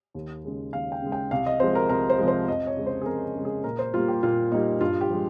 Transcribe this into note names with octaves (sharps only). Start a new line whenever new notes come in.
D#2
C#3 G#3
D#2 F5
G5
C#3 G#3
G5
C2 F5
D#5
C3 F3 G#3 C5
A#4
C2 A#4
C5
C3 F3 G#3
C5
F2 D#5
C#5
C#3 G#3
C5
G#4
F2 A#4
A#4
C#3 G#3
G#4
A#2 A#4
C5
G3 A#3 F4
G4
A#2 F4
G3 A#3 D#4
G2 F4
G4
F3 G#3